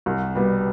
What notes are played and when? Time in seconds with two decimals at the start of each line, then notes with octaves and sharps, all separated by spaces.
0.06 C2
0.35 B2 G3 B3